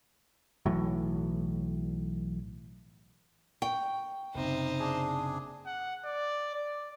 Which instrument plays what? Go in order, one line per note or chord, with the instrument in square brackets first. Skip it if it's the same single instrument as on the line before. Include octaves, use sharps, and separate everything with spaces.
[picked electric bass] B1 A2 E3 F#3
[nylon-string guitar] G5 [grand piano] C#6
[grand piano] F#1 C3 [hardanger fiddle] D#4 C5
[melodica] D4 G#4
[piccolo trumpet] F#5
D5
D5